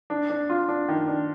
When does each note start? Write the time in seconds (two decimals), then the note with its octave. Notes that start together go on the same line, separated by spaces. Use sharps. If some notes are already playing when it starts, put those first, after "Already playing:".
0.10 D4
0.30 D4
0.50 F4
0.68 D4
0.88 D#3
1.08 D4